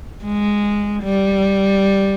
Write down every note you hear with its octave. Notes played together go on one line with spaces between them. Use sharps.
G#3
G3